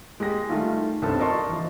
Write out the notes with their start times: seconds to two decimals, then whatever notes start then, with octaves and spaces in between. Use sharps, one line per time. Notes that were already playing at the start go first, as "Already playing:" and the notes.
0.20 G#3 G4 A#6
0.49 D#3 G3 A3 F4
1.02 G1 C2 G2 C4 A4 A5
1.19 A#4 D5 D#5 A5 C6 C#6
1.49 E3 F3